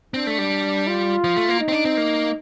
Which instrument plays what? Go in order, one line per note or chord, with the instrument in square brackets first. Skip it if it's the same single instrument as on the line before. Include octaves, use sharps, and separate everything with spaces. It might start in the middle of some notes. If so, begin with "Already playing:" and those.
[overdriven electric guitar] C4 [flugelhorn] D4
[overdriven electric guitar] A3
G3
[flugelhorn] F4
[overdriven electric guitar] F3
A3
A#3
[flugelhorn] D#4
[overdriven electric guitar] C4
D4
C4
A#3